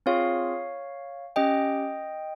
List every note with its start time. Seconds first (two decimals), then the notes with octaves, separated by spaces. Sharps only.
0.06 C4 F4 G#4 C#5 F5
1.36 C#4 G4 D#5 G5